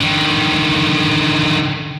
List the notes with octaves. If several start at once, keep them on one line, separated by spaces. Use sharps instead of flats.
D3 D#3